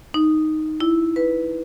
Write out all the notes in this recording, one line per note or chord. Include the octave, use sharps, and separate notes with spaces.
D#4
E4
B4